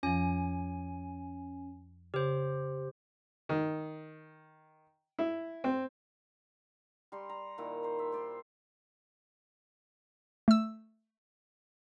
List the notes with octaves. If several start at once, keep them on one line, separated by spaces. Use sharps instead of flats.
F2 F3 C#4 G#5
C#3 G4 C5
D#3
E4
C4
G3 A#5 C6
A#5
A#2 D#3 D#4 E4
C5 A#5
E5
C5 D5 C6
A3 E6